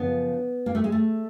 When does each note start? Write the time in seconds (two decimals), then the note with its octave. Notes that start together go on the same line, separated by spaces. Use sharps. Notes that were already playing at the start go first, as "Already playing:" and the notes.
Already playing: F#2 C#3 F3 B3
0.66 A#3
0.75 A3
0.84 G#3
0.92 A3